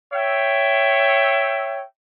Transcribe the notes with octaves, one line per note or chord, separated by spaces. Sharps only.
C#5 E5 G5